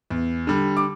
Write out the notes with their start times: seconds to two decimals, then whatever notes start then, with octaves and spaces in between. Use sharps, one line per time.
0.10 E2
0.47 D3 G3
0.77 D6